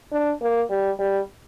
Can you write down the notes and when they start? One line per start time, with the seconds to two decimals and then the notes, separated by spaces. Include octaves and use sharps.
0.13 D4
0.41 A#3
0.70 G3
0.99 G3